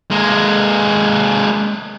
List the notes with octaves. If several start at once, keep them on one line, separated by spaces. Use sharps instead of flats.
G#3 A#3